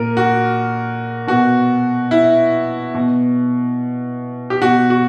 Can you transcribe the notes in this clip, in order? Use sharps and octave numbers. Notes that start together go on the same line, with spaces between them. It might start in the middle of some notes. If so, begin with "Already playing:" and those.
Already playing: A#2 A#4
F#4
B2 F#4
E4
B2
G4
B2 F#4
F#4